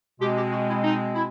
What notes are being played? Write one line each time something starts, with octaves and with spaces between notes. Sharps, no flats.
B2 G#3 C4 G4
G4
F#4
E4
D#4
E4